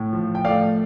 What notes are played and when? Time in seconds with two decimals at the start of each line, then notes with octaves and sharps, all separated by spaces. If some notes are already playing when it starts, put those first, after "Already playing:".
Already playing: A2
0.13 F3
0.35 G5
0.45 A3 D5 F5